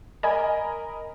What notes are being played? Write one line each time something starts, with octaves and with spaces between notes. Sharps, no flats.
A#4 D#5 G#5 B5